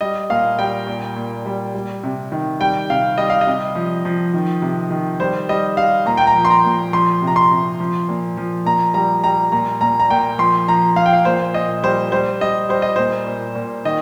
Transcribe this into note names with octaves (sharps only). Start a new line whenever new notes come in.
G3 D#5
A#2 F5
G3 G5
A#2
A#2
G3
G3
C3
D#3
G3 G5
C3 F5
G3 D#5
F5
D#5
C3
F3
F3
D#3
C3
D#3
G3 C5
G3 D#5
G3 F5
A#2 A#5
G5
A#5
F3
C6
A#5
A#2
F3 C6
C3
A#5
C6
C3
F3
A#2
F3
A#2 A#5
G3 A#5
G3 A#5
A#2 A#5
A#2 A#5
A#5
A#2 G5
F3 C6
F3 A#5
F3 F5
G5
F5
A#2 C5
A#2 D#5
G3 C5
G3 C5
G3 D#5
G3 C5
D#5
A#2 C5
A#2
A#2
D#3 D#5